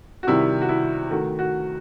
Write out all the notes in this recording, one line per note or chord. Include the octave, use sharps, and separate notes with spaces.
F#4
C3 D#3 G3 E4
F#4
E4
D#3 A3 F#4
F#4